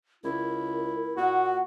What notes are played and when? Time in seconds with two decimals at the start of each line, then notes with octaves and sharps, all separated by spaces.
0.24 C#2 E4 A#4
1.17 A#2 F#4 F#5